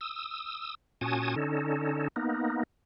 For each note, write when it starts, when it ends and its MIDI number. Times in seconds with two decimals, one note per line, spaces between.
0.01 0.75 87
0.01 0.75 88
1.01 1.35 46
1.01 1.35 61
1.01 1.35 66
1.01 1.35 80
1.01 1.35 81
1.01 1.35 87
1.36 2.08 50
1.36 2.08 61
1.36 2.08 63
1.36 2.08 69
2.16 2.63 58
2.16 2.63 59
2.16 2.63 63